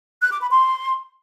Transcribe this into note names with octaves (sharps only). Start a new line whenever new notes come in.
F#6
D6
B5
C6